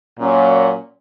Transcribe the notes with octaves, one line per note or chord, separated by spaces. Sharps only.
A#2 F#3 C#4